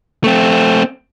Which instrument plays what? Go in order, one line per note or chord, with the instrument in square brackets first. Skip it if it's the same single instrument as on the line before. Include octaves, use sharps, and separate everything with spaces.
[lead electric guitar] A3 C4